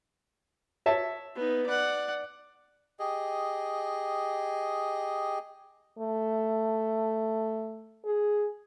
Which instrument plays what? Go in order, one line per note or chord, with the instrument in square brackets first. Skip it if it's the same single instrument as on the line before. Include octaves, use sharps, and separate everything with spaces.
[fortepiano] C#5 E5 A5
[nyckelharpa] B3 D#4
D5 F#5
[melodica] G4 G#4 D#5
[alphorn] A3
G#4